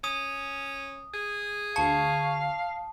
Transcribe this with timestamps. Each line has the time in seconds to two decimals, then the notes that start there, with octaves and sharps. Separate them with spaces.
0.04 C#4 D#6
1.14 G#4
1.76 D2 F5 A5 C#6